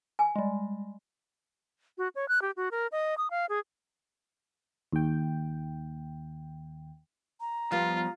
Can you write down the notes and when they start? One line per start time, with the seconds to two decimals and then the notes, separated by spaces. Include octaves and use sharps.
0.19 G#5
0.36 G3 G#3
1.98 F#4
2.15 C#5
2.29 F#6
2.42 G4
2.56 F#4
2.71 A#4
2.92 D#5
3.18 D#6
3.30 F5
3.49 G#4
4.93 D#2 G5
7.41 A#5
7.72 F3 G3 B3 F4